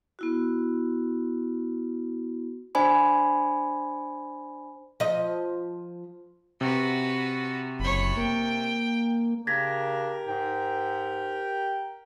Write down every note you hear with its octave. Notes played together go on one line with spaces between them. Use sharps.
B3 E4 F#4
D4 C5 D5 G#5 B5
F3 D#5
C3 F#4 B4
F#1 C#5 B5
A#3 G5
C#3 D4 G4 A#4 G#6 A#6 B6
G#2 G5